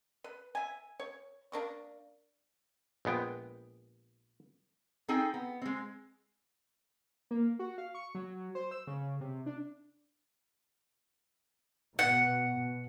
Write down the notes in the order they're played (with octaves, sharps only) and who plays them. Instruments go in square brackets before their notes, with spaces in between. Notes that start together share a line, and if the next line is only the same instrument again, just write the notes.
[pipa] B4
E5 G#5
C#5
A#3 D4 A#4 C#6
[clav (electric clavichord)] A#1 G#3 B3 G5
[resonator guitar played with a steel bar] C4 D#4 G#4 A4 G5 G#5
B3
G#3 C4
[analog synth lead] A#3
F#4
F5
C#6
F#3
C5
E6
C#3
C3
D4
[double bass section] B2 [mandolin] F#5